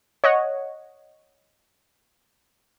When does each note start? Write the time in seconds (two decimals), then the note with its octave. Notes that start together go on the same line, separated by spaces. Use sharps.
0.24 C#5 D#5 F#5